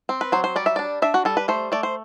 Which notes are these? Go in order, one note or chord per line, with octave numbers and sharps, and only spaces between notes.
C4
B4
F#3 C5
C5
G3 D5
E5
D4 D5
D4 E5
F#4
G3 A4
B4
A3 C5
A3 D5
C5